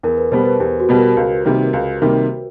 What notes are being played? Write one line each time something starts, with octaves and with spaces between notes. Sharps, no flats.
E2 A#4
B4
B2 G3 B3 C5
B4
E2 G4
F#4
B2 G3 B3
A#4
C#2
C3 D#3 G3 A#3
C#2
C3 D#3 G3 A#3